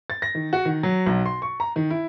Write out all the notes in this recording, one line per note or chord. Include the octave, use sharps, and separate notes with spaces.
A6
A#6
D#3
F#4
D#3
F#3
B1
C6
C#6
A#5
D#3
E4